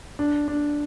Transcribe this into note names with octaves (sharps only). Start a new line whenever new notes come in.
D4
D4